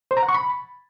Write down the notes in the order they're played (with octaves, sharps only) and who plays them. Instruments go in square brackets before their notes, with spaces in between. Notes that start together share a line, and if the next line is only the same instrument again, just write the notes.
[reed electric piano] C5
A#5
F#5
C#6
B5